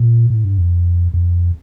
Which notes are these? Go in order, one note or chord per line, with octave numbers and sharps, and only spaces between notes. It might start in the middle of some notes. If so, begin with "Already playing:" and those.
Already playing: A#2
A2
G2
F2
F2